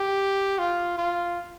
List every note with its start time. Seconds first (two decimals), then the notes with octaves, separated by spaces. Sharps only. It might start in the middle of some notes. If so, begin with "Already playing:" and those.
Already playing: G4
0.58 F4
0.98 F4